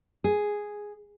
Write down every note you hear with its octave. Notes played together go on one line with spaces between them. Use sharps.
G#4